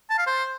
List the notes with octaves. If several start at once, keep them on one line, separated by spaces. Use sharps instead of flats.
A5
F5
C5